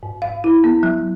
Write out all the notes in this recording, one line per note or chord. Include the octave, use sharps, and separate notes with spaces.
G#2
F5
E4
B3
F#3